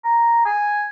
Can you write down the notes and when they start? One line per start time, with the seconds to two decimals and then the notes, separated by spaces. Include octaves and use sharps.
0.05 A#5
0.46 G#5